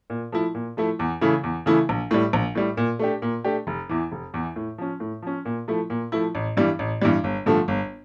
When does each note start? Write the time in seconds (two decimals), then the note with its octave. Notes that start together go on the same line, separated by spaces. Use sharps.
0.10 A#2
0.32 F3 A3 E4
0.55 A#2
0.77 F3 A3 E4
0.99 E2
1.21 C#3 E3 A3 E4
1.44 E2
1.66 C#3 E3 A3 E4
1.89 A#1
2.11 A2 G3
2.33 A#1
2.55 A2 G3
2.77 A#2
2.99 A3 D4 G4
3.22 A#2
3.45 A3 D4 G4
3.67 F1
3.89 E2 E3
4.12 F1
4.34 E2 E3
4.56 A2
4.78 F3 C#4
5.00 A2
5.22 F3 C#4
5.45 A#2
5.68 F3 A3 E4
5.90 A#2
6.12 F3 A3 E4
6.35 A1
6.57 G2 E3 G3
6.79 A1
7.02 G2 E3 G3
7.24 G1
7.46 G2 D3 F3 A3
7.68 G1